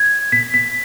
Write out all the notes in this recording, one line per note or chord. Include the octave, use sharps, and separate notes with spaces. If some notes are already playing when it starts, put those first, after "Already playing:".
Already playing: G#6
B6
B6